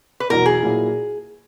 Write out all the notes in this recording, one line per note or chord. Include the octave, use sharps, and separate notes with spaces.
B4
E2 B2 F#3 A#4
G#4
A#2 F#3 A#3 E4